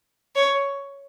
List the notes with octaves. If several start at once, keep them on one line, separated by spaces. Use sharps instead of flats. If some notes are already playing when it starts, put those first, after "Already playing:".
C#5